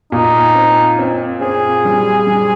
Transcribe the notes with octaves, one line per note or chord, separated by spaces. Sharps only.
A#2 D#4
C4
C4
C4 G#4
G3
G3